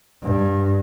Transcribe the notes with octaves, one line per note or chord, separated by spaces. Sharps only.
G2